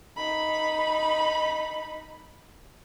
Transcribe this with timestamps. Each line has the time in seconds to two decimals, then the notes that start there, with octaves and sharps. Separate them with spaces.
0.17 D#4 B5